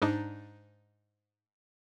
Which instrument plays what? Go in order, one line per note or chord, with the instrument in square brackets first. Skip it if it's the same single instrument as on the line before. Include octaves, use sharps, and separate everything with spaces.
[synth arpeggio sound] G#2 D4 D#4